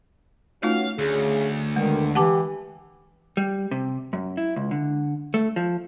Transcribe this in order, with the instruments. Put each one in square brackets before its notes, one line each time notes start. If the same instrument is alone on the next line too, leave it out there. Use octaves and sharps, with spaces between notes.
[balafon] A3 D#4 F4 [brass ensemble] B3 C#4 F#4 [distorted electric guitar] F5
[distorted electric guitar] D2 [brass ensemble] C#3 G#4
[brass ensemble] B2 D3 [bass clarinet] D#3 [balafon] G#3
[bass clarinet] E3 [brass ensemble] G4 [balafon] F#5 A5 D6
[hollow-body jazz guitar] G3
C3
F#2
E4
C#2
D3
A3
F3